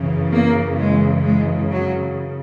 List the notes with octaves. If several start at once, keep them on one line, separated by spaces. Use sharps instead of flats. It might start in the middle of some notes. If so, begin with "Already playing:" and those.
Already playing: F#2 C#3 E3
A#3
G#3
G#3
F#3